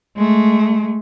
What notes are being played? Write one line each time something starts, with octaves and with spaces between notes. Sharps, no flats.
G#3 A3